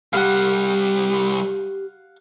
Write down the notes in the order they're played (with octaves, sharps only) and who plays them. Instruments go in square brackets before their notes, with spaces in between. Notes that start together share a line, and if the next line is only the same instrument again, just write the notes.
[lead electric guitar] C2 G3 [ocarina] G4 [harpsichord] F5 F#5